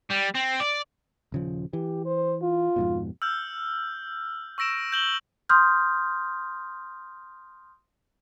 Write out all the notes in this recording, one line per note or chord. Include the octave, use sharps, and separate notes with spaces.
G3
C4
D5
D#1 C#3 F3
E3 G4
C5
F4
F2 G#2 B2
E6 F6 G6
C#6 E6 A#6 D7 E7
G6 F#7 G7
C6 D#6 F6 G6